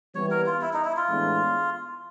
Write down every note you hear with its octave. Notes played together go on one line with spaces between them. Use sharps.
E3 G3 B3 C#5
A#4
F4
E4
D#4
E4
F4
A2 E3 G#3 B3 D4